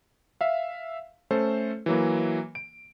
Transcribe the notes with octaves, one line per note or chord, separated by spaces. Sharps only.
E5 F5
A3 C#4 A4 C5
E3 F#3 A#3
D7